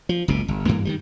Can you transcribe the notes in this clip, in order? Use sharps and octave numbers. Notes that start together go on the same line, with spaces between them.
F3
F#1 C#2 B2
G1
G2 E3 A#3
D#3 F#3 G3